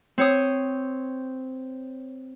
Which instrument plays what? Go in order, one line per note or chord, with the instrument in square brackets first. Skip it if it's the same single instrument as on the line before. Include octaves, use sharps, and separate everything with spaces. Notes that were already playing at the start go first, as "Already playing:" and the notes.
[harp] C4 C#5 D#6